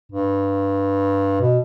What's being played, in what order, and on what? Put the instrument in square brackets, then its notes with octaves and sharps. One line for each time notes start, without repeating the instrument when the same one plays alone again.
[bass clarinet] G2
B2